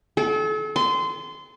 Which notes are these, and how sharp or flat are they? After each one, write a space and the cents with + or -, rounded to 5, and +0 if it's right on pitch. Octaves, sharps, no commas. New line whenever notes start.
A4 -40
C6 -20